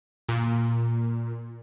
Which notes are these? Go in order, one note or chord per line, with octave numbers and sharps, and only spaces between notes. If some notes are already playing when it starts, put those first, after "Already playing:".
A#2